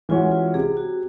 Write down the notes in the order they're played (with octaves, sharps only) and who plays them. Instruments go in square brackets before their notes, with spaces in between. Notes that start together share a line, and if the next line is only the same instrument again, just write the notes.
[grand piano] E3 G#3 C#4 F#4 [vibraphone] F4
[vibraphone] F4
[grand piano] C3 [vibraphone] G#4
[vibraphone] F#4